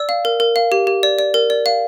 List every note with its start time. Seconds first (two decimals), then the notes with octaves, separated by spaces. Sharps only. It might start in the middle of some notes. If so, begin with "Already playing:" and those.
Already playing: D5 E6
0.09 F5
0.25 A#4
0.40 A#4
0.56 F5
0.72 G4
0.87 G4
1.03 D5
1.19 D5
1.34 A#4
1.50 D5
1.66 F5